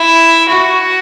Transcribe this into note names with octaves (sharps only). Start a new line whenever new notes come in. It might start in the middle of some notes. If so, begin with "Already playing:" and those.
Already playing: E4
F#4